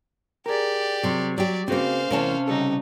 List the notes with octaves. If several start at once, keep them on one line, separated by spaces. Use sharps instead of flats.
G4 G#4 A#4 D5
C3 F#3
F#3 G4 D5
C#3 A#3 C4 F#4 B4 C5 F5
E2 A2 C3 C#4 A#4 A5
C#3 G3 D#4 A4